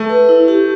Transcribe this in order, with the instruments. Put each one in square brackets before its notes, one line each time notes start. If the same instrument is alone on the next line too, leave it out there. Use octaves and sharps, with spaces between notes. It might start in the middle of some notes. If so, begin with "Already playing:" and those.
Already playing: [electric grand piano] A3
[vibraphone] B4
E4
G4